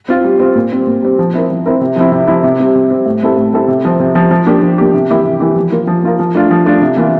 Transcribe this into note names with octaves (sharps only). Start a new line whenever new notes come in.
C4 F4
G3
C4 F4
A#2
G3 C4
A#2
G3 C4
F3
C4 E4 A#4
F3
C4 E4 A#4
C3
F3 C4 E4
C3
F3 C4 E4
C3
G3 C4
C3
G3 C4
A2
G3 C4 E4 A4
A2
G3 C4 E4 A4
C3
F3 C4
C3
F3 C4
F3
A#3 D4 G4
F3
A#3 D4 G4
C3
E3 A#3 E4 G4
C3
E3 A#3 E4 G4
F3
A#3 F4 A#4
F3
A#3 F4 A#4
F3
A3 D4 F4
F3
A3 D4 F4
C3
E3 A#3 F4